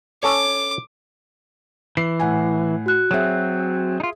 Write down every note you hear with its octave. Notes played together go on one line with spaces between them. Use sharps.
C#4 A4 C#5 D6
E3 C7
A2 F#5 G#5
F#4 F#6
F#3 C4 G#4 E5
D#4 F4